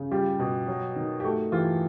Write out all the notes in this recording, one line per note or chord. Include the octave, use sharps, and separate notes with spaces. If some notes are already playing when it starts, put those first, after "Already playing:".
Already playing: C#3
G3 F4 G4
B2
F#3
D#3
G4
A3 F#4
E3 F4 G4